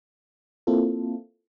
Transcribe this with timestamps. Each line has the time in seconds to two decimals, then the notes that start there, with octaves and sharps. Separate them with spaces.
0.67 A#3 C4 E4 F4 A4